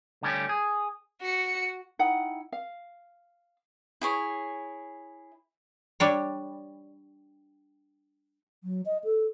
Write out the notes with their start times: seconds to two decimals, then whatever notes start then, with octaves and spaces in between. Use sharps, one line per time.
0.23 D3 G3 A3 C#4 G4
0.49 G#4
1.21 F#4 C#7
1.99 D#4 E4 F#5 G5
2.52 F5
4.01 E4 G#4 C#5
6.00 G3 D4 C#5
8.64 F#3
8.86 D#5
9.04 A4